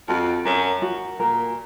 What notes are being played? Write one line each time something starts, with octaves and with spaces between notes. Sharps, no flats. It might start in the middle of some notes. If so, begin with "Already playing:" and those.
F2 F#4
F#2 A#4
F#4
A#2 A#4